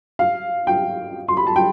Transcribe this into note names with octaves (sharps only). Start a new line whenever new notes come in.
F5
G5
C6
B5
A5
G5